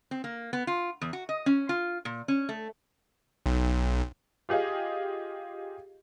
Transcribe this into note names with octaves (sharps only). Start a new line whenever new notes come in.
C4
A#3
B3
F4
E2
F#4
D#5
C#4
F4
A#2
C#4
A3
B1
F4 G4 G#4 D#5 F5